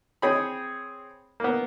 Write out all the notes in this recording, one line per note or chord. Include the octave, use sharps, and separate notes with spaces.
C4 G#4 C#5 G5 B5
A#3 B3